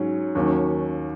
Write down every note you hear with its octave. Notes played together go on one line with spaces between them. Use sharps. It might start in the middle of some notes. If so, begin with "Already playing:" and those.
Already playing: G#2 F#3 C#4
D#2 D#3 F#3 C#4